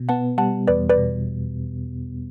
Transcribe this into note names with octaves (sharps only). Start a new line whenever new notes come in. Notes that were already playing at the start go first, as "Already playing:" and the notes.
Already playing: B2
B3 F#5 A5
G3 F#5 A5
E2 B4 D5
B4 D5
B2